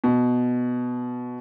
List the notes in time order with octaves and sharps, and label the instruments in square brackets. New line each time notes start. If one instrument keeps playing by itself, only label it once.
[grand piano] B2